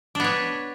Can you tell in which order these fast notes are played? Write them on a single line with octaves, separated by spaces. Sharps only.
D4 B3 C#5